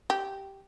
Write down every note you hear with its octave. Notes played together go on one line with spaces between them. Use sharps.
G4